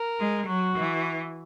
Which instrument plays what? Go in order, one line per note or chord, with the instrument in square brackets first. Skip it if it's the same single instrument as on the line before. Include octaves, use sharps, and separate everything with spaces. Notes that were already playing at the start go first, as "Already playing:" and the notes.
Already playing: [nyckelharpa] A#4
[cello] G#3
[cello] F#3 [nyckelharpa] F#4
[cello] E3